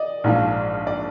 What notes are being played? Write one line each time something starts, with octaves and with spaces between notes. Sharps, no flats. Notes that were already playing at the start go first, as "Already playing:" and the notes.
Already playing: D5 D#5
A#1 G#2 F3
D5